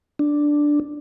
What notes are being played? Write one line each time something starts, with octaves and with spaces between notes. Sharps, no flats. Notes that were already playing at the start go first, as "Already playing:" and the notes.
D4